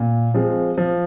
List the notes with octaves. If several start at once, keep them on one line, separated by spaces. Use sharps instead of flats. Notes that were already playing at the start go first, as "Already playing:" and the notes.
Already playing: A#2
F3 G#3 C4
F3